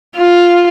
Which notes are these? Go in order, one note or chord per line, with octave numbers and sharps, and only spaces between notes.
F4